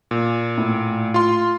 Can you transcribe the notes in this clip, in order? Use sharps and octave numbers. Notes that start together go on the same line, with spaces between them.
A#2
A2
F4 C6